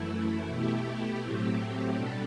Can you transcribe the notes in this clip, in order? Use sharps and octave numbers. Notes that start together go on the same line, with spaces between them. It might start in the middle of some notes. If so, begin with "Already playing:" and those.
Already playing: F#2 E3 A3 E4
B2 A3 E4 G4
A2 F#3 A3 C4 G4
B2 G3 D4 A4